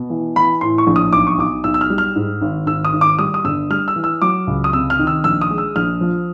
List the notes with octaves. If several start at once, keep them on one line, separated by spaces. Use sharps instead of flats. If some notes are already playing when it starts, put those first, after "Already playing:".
Already playing: B2
E3
E3 B5
A2 C6
C#6
A#1
D#6
B1 D6
C#6
B1 D6
B1 E6
E6
F6
G3
F6
G#2
G#1
G#1 E6
D#6
G#1
D6
G3 D#6
D#6
G1 E6
G3 F6
E6
E3
E6
F#3 D6
C#2
D#6
C3 E6
F6
D#3
E6
A#1 E6
D#6
G#3
E6
A#1 F6
F3